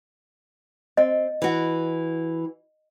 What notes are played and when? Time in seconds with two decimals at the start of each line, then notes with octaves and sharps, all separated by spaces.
0.97 C4 D#5
1.42 E3 F#4